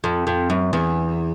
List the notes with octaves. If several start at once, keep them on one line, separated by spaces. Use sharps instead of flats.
F2
F2
F#2
E2